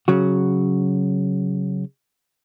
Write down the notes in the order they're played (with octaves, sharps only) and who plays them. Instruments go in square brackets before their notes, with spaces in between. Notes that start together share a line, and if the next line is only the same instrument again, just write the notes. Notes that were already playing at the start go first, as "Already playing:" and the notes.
[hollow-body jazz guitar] C#3 F#3 F#4